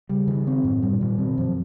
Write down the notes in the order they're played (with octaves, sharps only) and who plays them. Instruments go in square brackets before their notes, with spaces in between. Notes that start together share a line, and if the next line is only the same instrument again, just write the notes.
[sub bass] C#3 [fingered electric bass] G3
[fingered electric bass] D#3
C4
[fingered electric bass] F#2 [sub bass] A2
[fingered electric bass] G3
[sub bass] A#2
[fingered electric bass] D#3
[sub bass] B2 [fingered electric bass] C4
[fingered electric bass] F#2 [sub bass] F3